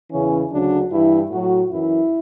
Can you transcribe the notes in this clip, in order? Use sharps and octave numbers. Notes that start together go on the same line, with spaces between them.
E2 C#3 E3 C#4
D2 C#3 F#3 D4
G2 E3 E4
A2 F#3 F#4
F#2 E3 E4